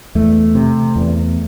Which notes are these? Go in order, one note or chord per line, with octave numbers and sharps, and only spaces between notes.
E2 A3
C3
E2